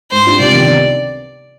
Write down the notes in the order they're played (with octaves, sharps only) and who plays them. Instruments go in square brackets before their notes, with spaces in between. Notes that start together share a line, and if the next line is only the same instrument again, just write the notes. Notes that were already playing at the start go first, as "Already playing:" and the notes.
[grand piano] G#2 [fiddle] C5
[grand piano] G3 D4 F4
[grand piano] C3 [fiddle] D5
[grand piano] D#3 B3